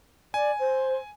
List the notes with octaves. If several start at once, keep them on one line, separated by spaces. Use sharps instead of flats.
D5 G#5
C5